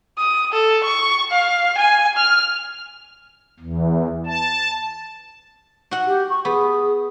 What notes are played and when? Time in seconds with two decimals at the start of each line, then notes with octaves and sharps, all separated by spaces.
0.18 D#6
0.52 A4
0.83 C#6
1.31 F5
1.78 G#5
2.17 F6
3.60 E2
4.26 A5
5.91 F#4 F#5
6.06 G4
6.30 C#6
6.45 B3 G#4